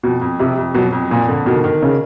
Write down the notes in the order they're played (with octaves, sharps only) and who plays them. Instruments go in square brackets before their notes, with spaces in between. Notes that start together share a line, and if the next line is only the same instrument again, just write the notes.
[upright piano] F2 [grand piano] B2
[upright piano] F2
[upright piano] F2 [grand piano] C3
[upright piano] F2
[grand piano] B2 [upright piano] F#3
[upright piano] F2
[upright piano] F2 [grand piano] A#2
[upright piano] D3
[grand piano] B2 [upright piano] D#3
[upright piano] D#3
[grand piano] C#3